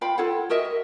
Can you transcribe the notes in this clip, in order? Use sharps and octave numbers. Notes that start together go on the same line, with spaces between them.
F4 F5 G5 B5
F4 A4 C#5 F#5
F#4 A#4 D#5 E5